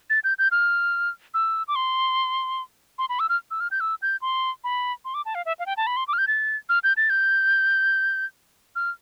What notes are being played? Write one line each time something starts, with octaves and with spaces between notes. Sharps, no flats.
A6
G6
G6
F6
E6
D6
C6
C6
B5
E6
F6
E6
F6
G6
E6
G6
C6
B5
C6
D6
A5
F5
E5
F5
G5
A5
B5
C6
D6
F6
G6
A6
F6
G6
A6
G6
F6